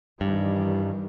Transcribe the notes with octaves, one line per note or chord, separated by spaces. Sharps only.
G2 D#3 E3 G3